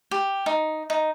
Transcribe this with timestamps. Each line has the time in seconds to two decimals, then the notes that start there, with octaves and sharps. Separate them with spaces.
0.11 G4
0.46 D#4
0.90 D#4